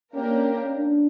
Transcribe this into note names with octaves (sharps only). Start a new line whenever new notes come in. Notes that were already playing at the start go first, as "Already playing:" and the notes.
A#3 C#4 D4 G4 A#4
C#4
D4